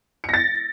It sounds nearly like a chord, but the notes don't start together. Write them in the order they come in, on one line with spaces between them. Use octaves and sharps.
C#7 A#6 A6